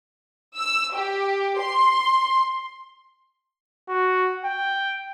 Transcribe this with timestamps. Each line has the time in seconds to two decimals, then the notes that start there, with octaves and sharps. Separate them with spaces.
0.56 E6
0.95 G4
1.61 C6
3.88 F#4
4.45 G5